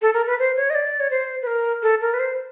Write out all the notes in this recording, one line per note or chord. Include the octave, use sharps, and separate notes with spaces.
A4
A#4
B4
C5
C#5
D#5
D5
C#5
C5
B4
A#4
A4
A#4
B4
C5